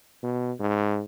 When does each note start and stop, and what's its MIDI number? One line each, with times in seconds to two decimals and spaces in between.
0.23 0.52 47
0.60 1.04 44